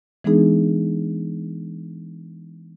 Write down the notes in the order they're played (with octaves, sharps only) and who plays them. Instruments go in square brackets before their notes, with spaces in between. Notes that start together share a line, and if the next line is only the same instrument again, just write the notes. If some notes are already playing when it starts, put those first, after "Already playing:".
[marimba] E3 G#3 B3 D4 D#4 G#4